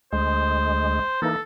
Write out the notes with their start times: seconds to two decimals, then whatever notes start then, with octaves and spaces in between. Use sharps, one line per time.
0.12 D2 G#3 C5
1.22 E3 A#3 D#4 A4